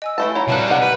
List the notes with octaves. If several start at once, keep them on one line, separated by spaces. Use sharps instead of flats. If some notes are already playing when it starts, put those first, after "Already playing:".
D#5 G#5 E6
E3 A3 A5
E3 F#3 C#5 A#5
C3 G3 F5 A5 F#6
D#3 F#5 F#6
B4